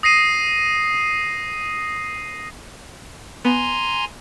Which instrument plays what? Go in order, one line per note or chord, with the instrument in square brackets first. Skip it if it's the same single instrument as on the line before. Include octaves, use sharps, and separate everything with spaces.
[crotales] D#6 A#6 C7 D#7
[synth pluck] B3 [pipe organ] G#5 A#5 C6